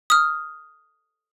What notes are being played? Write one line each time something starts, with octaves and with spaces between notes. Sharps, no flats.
D#6 F6